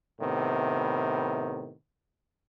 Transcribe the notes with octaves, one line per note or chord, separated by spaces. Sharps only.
A2 C3 D#3 B3